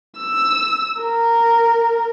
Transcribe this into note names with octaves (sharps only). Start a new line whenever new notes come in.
E6
A#4